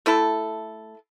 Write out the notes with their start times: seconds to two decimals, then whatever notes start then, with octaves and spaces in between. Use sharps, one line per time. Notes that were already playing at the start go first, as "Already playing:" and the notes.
0.06 A3 E4 A4